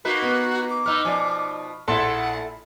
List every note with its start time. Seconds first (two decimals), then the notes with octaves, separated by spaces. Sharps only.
0.05 A#3 D#4 F#4 B4
0.22 B3
0.70 D6
0.86 B3 D#4 E6 F6
1.05 B2 F3 D#4 D5 G#5
1.88 A#1 E4 A4 F#5 C6